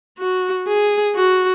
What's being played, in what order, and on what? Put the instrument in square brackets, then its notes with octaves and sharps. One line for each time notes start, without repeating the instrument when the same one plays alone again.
[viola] F#4
G#4
F#4